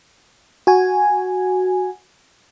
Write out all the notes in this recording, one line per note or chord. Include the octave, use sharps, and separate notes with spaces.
F#4 G#5